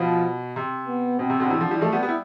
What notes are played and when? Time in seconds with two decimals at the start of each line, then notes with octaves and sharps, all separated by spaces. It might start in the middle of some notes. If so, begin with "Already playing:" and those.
Already playing: B2 F3
0.56 C3
0.87 B3
1.18 B2 C4
1.30 C3
1.40 B2 D3
1.50 C3 E3
1.61 D3 F3
1.71 E3 G3
1.81 F3 A3
1.92 G3 B3
2.03 G3 B3
2.08 E4